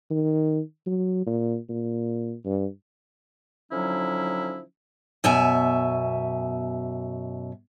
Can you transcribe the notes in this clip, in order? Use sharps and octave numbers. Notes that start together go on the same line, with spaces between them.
D#3
F#3
A#2
A#2
G2
D3 F3 F#3 C#4 D#4 E4
F#2 B2 E5 G#5